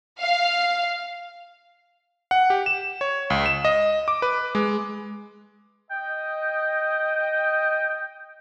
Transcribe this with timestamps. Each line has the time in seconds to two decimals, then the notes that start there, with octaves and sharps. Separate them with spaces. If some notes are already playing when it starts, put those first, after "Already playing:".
0.19 F5
2.31 F#5
2.50 G4
2.66 E7
3.01 C#5
3.30 C#2
3.46 E7
3.65 D#5
4.08 D6
4.22 B4
4.55 G#3
5.91 D#5 G5